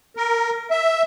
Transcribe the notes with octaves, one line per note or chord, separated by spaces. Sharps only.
A#4
E5